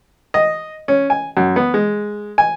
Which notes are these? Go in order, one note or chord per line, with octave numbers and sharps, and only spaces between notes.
D#5
C#4
G#5
F#2
B3
G#3
G#5